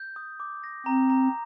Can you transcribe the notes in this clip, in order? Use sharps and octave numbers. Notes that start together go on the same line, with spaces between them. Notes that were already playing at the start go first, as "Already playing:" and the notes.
Already playing: G6
D#6
D6
A#6
C4 A#5
A#5